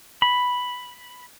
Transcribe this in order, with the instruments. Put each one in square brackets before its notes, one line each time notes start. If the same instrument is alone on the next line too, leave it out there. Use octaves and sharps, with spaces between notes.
[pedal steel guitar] B5